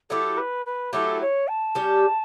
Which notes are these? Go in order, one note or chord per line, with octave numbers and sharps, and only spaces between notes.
F#3 A3 E4 G4 A4
B4
B4
F#3 A3 E4 G4 A4
C#5
A5
G3 C#4 G4